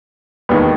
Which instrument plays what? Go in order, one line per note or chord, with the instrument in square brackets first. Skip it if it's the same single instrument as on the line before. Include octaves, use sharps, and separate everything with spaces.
[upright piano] E1 D#2 D#3 G3 B3